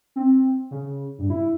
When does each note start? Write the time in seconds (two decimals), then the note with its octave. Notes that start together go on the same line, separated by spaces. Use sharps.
0.16 C4
0.71 C#3
1.19 G2
1.30 E4